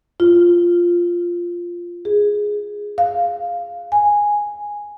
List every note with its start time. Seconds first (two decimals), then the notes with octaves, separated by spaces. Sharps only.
0.20 F4
2.05 G#4
2.98 F5
3.92 G#5